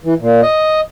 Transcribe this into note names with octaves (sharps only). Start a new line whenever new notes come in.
E3
A#2
D#5